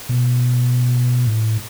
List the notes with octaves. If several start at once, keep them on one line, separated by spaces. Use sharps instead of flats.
B2
A2